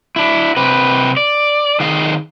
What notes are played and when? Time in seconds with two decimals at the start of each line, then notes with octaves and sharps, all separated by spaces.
0.16 D4 E4
0.57 C3 G4 B4
1.17 D5
1.80 D#3 G#4 F5